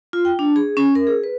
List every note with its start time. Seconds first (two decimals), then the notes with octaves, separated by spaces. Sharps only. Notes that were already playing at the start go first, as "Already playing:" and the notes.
0.13 F4
0.25 G5
0.39 D4
0.56 G#4
0.77 C#4
0.95 A#4
1.07 G#4
1.24 B4